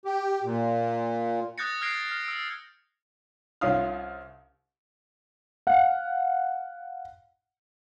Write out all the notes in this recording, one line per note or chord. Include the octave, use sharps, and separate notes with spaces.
G4
A#2
D#6 F#6 G6 A6 A#6 C#7
F6 F#6 G#6 A#6 C7 D7
F6
E6 D7
C2 C#4 F4 F5 D#6 F6
F5 F#5